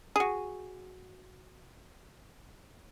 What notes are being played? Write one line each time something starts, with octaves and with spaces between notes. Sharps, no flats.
F#4 G#4